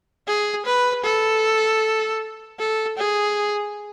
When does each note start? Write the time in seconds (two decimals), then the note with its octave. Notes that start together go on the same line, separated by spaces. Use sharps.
0.27 G#4
0.66 B4
1.04 A4
2.59 A4
2.98 G#4